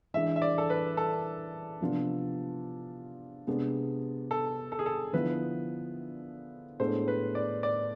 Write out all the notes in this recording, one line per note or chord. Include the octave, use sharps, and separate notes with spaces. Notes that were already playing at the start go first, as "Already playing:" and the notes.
E3 G#3 D4 E5
E5
D5
A4
B4
A4
C3 F3 B3 D4 F4
C3 G#3 B3 D4
A4
A4
G#4
A4
D3 F3 B3 E4 B4
A2 G#3 B3 D4 A4 C5
B4
D5
D5